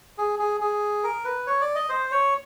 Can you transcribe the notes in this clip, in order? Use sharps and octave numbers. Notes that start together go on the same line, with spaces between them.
G#4
G#4
G#4
A#4
B4
C#5
D5
D#5
C5
C#5